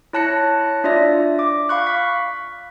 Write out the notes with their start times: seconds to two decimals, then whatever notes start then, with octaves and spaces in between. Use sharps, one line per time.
0.13 E4 C#5 A5 F#6 A#6 C#7
0.84 D4 F4 D5 E5 A#6
1.39 D6
1.69 F5 B5 C#6 F#6
1.87 B6